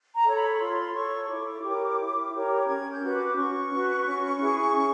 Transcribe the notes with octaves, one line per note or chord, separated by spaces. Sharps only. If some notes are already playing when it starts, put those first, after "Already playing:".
A#5
A4 C#5 A#5
B5
C#6
F4 C6
A4 C#5 C#6
C#6
E4 D6
G4 A#4 C#5
E4
G4 A#4 C#5
C#4 G#6
G6
F#4 B4
D6
C#4 C#6
F#4 B4
C#4
E4 G#4
C#4